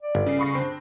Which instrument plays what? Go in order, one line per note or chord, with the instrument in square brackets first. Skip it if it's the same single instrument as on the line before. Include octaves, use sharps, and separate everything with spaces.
[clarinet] D5
[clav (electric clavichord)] G1
[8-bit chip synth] C#3 C7
[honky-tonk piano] B5 C#6 A#6
[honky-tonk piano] C4 [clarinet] D4